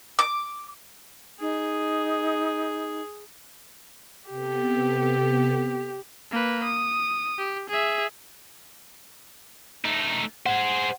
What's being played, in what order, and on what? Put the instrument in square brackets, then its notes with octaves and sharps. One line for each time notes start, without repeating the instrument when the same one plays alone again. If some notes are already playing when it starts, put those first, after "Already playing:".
[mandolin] D6
[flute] D#4 [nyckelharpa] G#4
[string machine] C3 B3 A4 [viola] G4
[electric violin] A#3 B4
D#6
G4
G#4 E5
[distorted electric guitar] A3 D#4
[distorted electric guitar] G#4 C5 [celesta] F#5